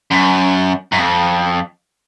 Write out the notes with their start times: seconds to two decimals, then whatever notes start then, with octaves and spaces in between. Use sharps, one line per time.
0.11 F#2
0.93 F#2
0.99 F2